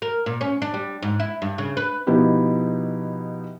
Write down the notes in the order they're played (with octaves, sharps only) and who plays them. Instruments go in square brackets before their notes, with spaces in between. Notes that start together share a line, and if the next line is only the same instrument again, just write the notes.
[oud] A#4
A#2
C#4
D4
G3
G#2
E4
G2
C#3
B4
[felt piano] B2 F3 B3 D#4 E4 G4